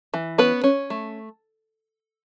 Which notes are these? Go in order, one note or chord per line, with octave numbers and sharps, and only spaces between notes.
E3
B3 C#4 B4
C#4
A3